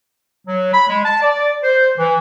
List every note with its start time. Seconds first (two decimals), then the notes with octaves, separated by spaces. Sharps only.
0.48 F#3
0.74 B5
0.89 G#3
1.04 A5
1.22 D5
1.63 C5
1.98 E3